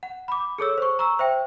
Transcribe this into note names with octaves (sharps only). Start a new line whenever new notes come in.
F#5
B5 D6
G#4 A4 C#5 E6
C5 C#6
A#5 C#6 E6
C5 E5 G5